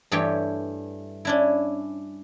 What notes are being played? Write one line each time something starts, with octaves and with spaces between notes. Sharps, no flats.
G2 E3 A3 G4 C#5 G5
C#4 D4 E4